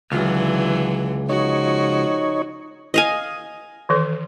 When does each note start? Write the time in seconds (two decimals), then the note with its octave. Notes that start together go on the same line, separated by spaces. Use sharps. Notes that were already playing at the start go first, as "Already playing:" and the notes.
0.12 C#2 D3 E3 F#3
1.29 F3 D#4 F#4 C#5
2.94 D#5 F5 G#5
3.89 D#3 E3 A4